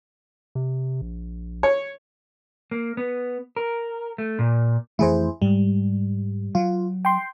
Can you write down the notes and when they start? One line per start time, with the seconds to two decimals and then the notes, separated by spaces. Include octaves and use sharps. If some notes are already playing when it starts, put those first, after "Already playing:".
0.55 C3
1.01 A#1
1.63 C#5
2.71 A#3
2.97 B3
3.56 A#4
4.18 A3
4.39 A#2
4.99 F2 E3 A3 E4 G#4 C5
5.42 G#2 G3
6.55 F#3 F4
7.05 G5 C6